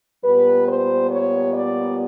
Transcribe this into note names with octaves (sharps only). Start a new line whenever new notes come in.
A#2 G3 B3 B4
C5
C#5
D5